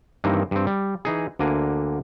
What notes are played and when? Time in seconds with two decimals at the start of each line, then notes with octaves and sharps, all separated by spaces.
0.24 G2 D#3 E3 A#3 C4 D#4
0.51 G2 C4
0.67 G3
1.05 E3 D#4 G#4
1.39 D2 D3 A#3 G#5